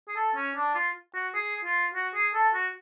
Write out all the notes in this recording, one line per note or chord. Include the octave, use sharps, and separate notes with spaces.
G#4
A4
C#4
D4
F4
F#4
G#4
F4
F#4
G#4
A4
F#4